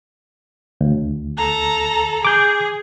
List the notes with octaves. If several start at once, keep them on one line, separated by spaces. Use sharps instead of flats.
D2
A4 A#5
G#4 D6 G6